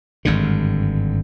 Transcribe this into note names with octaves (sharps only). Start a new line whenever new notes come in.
G#1 G2 D3